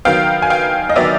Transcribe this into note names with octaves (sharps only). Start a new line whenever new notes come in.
D#3 F#3 B3 F5 G5
G#5
F5 G5
D#5
D#3 F#3 B3 D5 E5